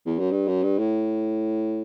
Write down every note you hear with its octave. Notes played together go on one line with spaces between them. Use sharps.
E2
F#2
G2
F#2
G2
A2